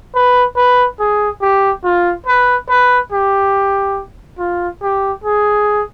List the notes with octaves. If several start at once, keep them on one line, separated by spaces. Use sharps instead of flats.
B4
B4
G#4
G4
F4
B4
B4
G4
F4
G4
G#4